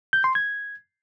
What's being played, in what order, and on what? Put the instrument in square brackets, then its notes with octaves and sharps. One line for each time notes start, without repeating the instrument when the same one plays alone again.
[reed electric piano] G6
C6
G#6